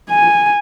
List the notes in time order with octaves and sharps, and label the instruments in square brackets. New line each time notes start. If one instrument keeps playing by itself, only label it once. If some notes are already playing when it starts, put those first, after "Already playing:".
[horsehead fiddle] G#5